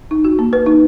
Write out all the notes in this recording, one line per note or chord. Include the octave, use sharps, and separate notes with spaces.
D#4
F#4
A#3
B4
D#4